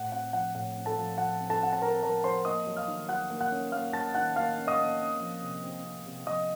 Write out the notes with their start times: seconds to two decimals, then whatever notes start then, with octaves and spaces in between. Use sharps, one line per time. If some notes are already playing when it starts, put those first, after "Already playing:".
Already playing: A2 F#5
0.12 C4 F#5
0.33 F3 F#5
0.55 A2 F#5
0.76 C4
0.86 A4 A5
0.97 F3
1.18 F3 F#5
1.40 C4
1.50 A4 A5
1.60 C4 F#5
1.73 A5
1.82 C4 A#4 A#5
2.03 F3 A#4 A#5
2.24 F3 C5 C6
2.45 A#3 D#5 D#6
2.67 F#3
2.76 F5 F6
2.88 D#3
3.09 F#3 F#5 F#6
3.30 A#3
3.40 F#5 F#6
3.51 C#4
3.72 A#3 F5 F6
3.93 F#3 A5 A6
4.15 D#3 F#5 F#6
4.36 A#3 F5 F6
4.57 C#4
4.67 D#5 D#6
4.78 A#3
5.00 C4
5.20 F3
5.42 C3
5.63 C4
5.84 C4
6.06 C3
6.27 F3 D#5 D#6